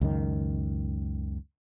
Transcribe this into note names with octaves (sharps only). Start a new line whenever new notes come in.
C#2 F#2 D#3